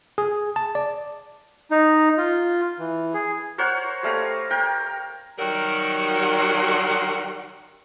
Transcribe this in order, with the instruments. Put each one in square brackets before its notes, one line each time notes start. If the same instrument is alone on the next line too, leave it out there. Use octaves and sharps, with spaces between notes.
[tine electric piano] G#4
A5
D5
[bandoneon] D#4
F4
E3
G#4
[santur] A#4 C5 C#5 F#5
G3 A3 F5 A#5
A#4 G5
[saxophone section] D#3 F#3 G3 F#4 A#4